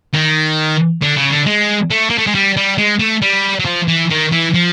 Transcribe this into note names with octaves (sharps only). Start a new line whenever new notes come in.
D#3
D3
C#3
D3
G#3
A3
A#3
A3
G#3
G3
G3
G#3
A3
G3
F#3
F3
E3
D#3
E3
F3